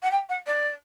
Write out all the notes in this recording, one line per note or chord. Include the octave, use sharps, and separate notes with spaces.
F#5
G5
F#5
D5